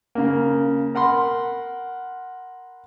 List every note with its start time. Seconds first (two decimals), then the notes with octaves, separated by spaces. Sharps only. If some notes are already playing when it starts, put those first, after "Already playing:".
0.15 C#3 A#3
0.95 A#4 F#5 B5 C6